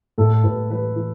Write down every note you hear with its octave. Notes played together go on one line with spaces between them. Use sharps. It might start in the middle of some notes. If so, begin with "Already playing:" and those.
A2 A4
A2 B4
E3 B4
E3